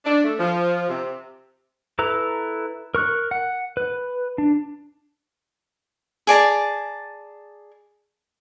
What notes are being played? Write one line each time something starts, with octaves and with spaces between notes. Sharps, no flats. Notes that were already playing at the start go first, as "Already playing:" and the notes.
D4
A3
F3
C3
E4 A4 B4 A#5
A#4 C#6 F#6
F#5
B4
D4
G#4 D5 A5 A#5